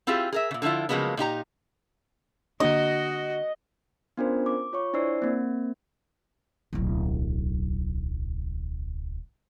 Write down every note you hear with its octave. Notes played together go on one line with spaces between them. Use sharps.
C4 E4 F4 G4 G#4
G#4 A#4 E5
A#2 C#3
D3 F3 C#4 E4 F4
C#3 F3 F#3 G#3 A#3 B3
A#2 D#4 G4 A#5
D3 A#3 D4 F#4 D#5
B3 C#4 D4 F4 A#4 C5
D6
F4 C#5 C#6
D4 E4 C5 D5 E6 C7
A#3 C4
D1 B1